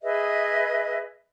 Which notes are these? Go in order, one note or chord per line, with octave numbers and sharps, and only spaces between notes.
G#4 B4 D#5 E5